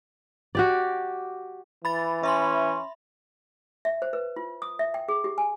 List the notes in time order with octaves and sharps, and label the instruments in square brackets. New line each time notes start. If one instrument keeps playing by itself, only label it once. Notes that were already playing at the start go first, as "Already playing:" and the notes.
[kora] F#4 G4 D5
[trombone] E3 [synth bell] B5 A6
[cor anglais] C#4 [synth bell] E5 B5 C6
[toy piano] E5
C5
B4
F4
D#6
E5
G5
G#4
G4
G#5